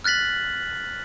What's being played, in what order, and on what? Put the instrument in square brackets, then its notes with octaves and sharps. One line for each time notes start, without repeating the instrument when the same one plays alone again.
[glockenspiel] F6 F#6 A6 B6 F#7